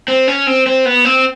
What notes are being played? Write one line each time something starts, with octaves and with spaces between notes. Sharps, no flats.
C4
C#4
C4
C4
B3
C4